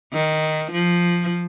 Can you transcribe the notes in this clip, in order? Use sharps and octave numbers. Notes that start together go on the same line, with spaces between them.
D#3
F3